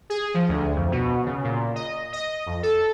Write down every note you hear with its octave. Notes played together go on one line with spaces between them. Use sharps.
G#4
F3
D2
F2
B2
C#3
A#2
D#5
D#5
F2
A4